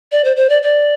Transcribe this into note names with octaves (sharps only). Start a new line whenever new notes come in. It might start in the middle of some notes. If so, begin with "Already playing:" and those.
D5
C5
C5
D5
D5